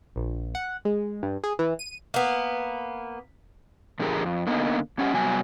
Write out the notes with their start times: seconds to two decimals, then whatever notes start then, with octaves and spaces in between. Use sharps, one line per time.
0.16 A#1
0.55 F#5
0.85 G#3
1.23 G2
1.44 G#4
1.59 E3
1.79 D#7
2.14 A#3 B3
4.00 A#2 D3 F3 G4 G#4 A#4
4.24 F2
4.47 D3 A#3 B3 D#4
4.98 G#2 C#4 G4 F#5
5.13 C3 F#3 G3 B3 G#5